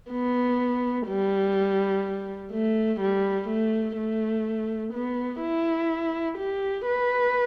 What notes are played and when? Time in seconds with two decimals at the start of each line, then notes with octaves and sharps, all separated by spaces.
0.11 B3
1.08 G3
2.52 A3
3.00 G3
3.48 A3
3.97 A3
4.93 B3
5.41 E4
6.38 G4
6.87 B4